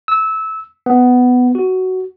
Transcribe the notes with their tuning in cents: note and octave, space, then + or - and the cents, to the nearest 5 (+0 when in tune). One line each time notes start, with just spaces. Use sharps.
E6 -20
B3 +10
F#4 +10